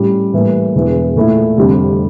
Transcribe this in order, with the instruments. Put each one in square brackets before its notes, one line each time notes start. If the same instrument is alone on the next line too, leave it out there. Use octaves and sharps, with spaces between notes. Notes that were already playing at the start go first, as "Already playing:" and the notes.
Already playing: [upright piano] A2 G3 C#4 G4
A2 E3 G3 A#3
E1 E2 E3
A#2 A3 E4
F1 F2 D3 G3